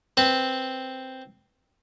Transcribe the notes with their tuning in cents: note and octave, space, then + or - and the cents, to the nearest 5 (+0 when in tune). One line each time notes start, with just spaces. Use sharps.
C4 +0 B4 +0